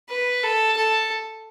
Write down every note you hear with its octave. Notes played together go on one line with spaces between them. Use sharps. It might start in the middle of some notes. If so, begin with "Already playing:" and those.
B4
A4
A4